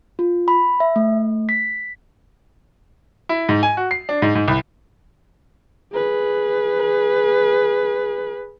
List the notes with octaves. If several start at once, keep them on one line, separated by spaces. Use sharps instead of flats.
F4
B5
E5
A3
B6
E4
G#2
G#5
F#4
C7
D4
G#2
G#2
C2
G#4 B4